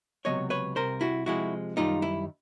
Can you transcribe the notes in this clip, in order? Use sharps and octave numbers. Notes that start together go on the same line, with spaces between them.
C#2 C3 D#3 F#3 B3 C#5 D#5
B4 C#5
C2 C3 A#4 C5
E4 F#4
C3 F3 G#3 E4 F#4
F#2 D#3 G3 D#4 F4
E4